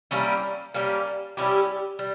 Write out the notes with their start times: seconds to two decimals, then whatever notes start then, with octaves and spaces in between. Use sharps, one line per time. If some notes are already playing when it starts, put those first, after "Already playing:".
0.11 G3 A#3 C#4 E4
0.74 G3 A#3 C#4
1.37 G3 C#4 E4 G4
1.99 G3